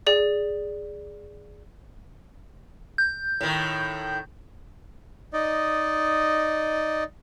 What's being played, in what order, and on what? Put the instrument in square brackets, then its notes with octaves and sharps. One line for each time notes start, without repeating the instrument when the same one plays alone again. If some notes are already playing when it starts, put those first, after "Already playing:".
[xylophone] G#4 D5
[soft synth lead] G6
[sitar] A2 D#3
[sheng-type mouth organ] D#4 D5 D#5